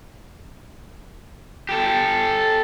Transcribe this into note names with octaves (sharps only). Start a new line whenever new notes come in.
G4 A4